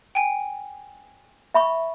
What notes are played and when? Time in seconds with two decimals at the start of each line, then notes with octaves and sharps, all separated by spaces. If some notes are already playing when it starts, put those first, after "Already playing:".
0.15 G5 G#5
1.54 E5 B5 C#6